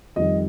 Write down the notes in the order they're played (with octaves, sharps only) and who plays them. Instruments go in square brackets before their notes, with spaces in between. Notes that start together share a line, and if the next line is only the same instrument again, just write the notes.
[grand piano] F2 D#3 G3 D#5